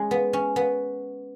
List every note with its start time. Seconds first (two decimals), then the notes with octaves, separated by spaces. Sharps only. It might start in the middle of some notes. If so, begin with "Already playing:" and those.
Already playing: G#3 C#4
0.11 B3
0.33 C#4
0.56 B3